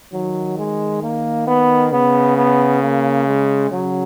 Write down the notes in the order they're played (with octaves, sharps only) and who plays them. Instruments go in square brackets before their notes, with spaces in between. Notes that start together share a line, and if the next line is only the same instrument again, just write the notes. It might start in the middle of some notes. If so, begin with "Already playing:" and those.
[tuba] D#3 [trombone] F#3
[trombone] G#3
A#3
B3
[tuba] C#3 [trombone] B3
[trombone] B3
A#3
G#3
[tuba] C#3 [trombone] F#3